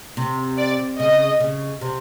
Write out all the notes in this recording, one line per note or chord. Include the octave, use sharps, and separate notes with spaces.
C3
D5
C#3 D#5
C#3
C3